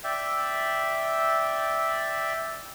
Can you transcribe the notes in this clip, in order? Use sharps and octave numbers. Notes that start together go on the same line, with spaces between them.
D5 E5 G5